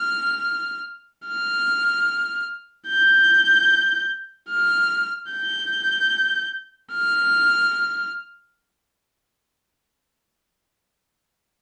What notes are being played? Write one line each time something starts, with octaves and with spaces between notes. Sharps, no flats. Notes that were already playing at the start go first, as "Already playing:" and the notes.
Already playing: F6
F6
G6
F6
G6
F6